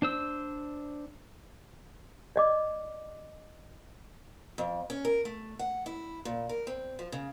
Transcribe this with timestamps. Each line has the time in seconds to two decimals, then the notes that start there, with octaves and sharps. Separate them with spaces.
0.02 D4 C5 E6
2.36 D5 D#5 D6
4.58 F2
4.90 C#4
5.05 A#4
5.25 A3
5.59 F#5
5.86 E4
6.25 A#2
6.49 A#4
6.67 C4
6.99 F3
7.12 C#3